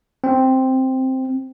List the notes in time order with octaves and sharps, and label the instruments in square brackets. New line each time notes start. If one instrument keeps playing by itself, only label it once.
[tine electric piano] C4